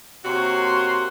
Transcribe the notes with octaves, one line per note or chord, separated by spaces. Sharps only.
C3 A#3 F#4 C#5 C6